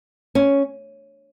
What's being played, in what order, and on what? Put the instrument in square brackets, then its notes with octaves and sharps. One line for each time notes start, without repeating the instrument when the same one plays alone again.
[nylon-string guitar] C#4